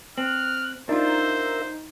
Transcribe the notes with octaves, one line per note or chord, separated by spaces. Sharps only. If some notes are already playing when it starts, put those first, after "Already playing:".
C4 F6 F#6
D4 D#4 F4 A#4 C5 E5